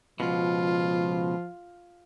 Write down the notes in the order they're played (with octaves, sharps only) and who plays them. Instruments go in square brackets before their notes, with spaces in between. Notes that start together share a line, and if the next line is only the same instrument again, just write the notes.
[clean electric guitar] C#2 B2 [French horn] F3 [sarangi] F4